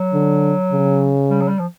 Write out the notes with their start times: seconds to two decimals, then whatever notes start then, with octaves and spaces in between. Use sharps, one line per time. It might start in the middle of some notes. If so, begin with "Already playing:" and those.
Already playing: F#3
0.13 D3
0.72 C#3
1.29 G3
1.41 F#3
1.48 G3
1.59 F3